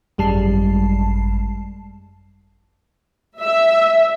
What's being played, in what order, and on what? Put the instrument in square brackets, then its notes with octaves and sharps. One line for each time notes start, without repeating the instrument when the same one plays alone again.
[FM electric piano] G#1 F#2 G3 G#3 A5 C7
[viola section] E5